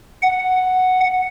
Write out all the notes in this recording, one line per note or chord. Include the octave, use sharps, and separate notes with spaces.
F#5